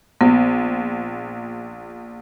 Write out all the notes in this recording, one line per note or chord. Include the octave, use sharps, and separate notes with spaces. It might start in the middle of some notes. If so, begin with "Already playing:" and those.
A#1 B3